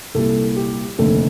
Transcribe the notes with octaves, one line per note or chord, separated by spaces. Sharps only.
C2 A#2 G3 A4
G4
F1 D#2 D3 A3 A4